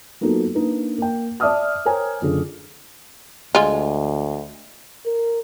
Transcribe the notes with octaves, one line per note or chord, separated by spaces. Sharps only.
F#3 A#3 B3 D#4 F4 A4
A#3 D4 D#4 B4
A#3 G5
D5 E5 A5 D6 D#6 F6
A#4 C5 C#5 G5 G#5 A#5
F#1 D3 F4 G#4 A4
D2 G#3 F4
A#4